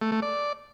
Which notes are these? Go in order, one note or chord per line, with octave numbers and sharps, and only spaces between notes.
A3
A3
D5